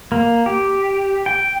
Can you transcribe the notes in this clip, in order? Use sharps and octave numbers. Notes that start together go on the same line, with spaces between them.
A#3
G4
G5